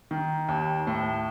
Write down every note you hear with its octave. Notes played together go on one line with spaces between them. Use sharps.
D#3
D#2
A2